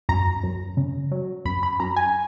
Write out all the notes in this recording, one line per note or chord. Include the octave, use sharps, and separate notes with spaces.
F#2 A#5
F#2
C#3
F#3
F#2 B5
B5
F#2 A#5
G#5